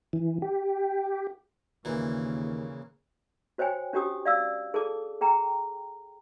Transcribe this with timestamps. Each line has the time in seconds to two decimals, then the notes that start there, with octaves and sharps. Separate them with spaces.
0.13 E3
0.42 G4
1.85 D#2 A#2 C#3 E3
3.58 F#4 C5 C#5 G5 G#5
3.93 C#4 D4 F#4 G4 D6 D#6
4.25 D5 F5 E6
4.74 G#4 A4 A5 D6
5.21 G#4 G5 A#5